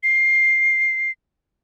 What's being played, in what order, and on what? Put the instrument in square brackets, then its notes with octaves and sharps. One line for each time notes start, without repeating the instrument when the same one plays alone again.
[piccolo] C7